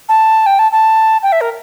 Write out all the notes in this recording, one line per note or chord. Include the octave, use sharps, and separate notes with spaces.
A5
G5
A5
A5
G5
E5
A#4